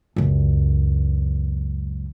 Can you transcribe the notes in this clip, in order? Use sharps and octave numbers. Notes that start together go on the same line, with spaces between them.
C#2 F#2